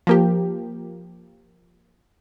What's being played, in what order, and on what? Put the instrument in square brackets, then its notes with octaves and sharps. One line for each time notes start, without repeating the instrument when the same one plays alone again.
[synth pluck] F3 A#3 G4